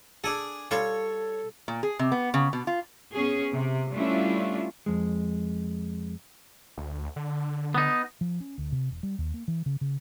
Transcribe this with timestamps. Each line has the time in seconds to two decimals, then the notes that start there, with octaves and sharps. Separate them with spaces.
0.24 D4 G#4 A4
0.71 G3 F4 A4 C#5
1.68 A#2
1.83 G#4
1.99 C3
2.12 B3
2.34 C#3
2.53 B2
2.67 F4
3.14 B3 C#4 G#4
3.53 C3
3.93 G3 A3 C#4 D4 E4 F4
4.86 F2 G#3
6.78 D2
7.16 D3
7.75 B3 D#4
8.21 F3
8.40 C#4
8.58 D2
8.72 C3
8.91 E1
9.03 G3
9.18 D#2
9.34 A#3
9.48 E3
9.66 C#3
9.81 C#3